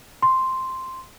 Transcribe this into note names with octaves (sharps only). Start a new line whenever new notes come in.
C6